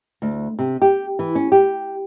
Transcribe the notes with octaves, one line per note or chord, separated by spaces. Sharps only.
D2
C3
G4
E3
C#4
G4